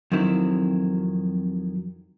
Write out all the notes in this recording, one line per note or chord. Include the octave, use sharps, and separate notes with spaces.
F2 D#3 F#3 C4 E4